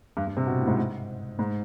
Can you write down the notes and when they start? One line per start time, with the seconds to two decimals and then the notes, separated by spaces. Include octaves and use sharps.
0.17 G2
0.27 G2
0.37 C3
0.47 B2
0.58 A2
0.67 G#2
1.39 G#2